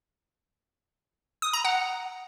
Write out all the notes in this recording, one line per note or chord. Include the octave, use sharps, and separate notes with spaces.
D#6
A#5
F#5